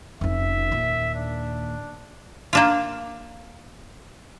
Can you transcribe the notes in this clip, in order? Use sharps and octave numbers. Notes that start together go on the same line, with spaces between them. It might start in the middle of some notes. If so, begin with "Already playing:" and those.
F1 C#4 E5
D#2 A#2
D4
A#3 D4 F4